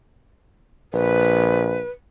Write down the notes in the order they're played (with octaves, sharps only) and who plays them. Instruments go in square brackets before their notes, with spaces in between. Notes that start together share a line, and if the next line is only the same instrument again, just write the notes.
[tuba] A#1 [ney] B4